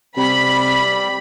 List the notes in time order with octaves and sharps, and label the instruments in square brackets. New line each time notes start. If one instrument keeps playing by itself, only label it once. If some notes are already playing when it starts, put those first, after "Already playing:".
[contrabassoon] C3 [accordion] G3 [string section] B5